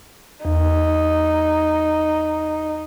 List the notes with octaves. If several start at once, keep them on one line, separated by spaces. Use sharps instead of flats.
E2 D#4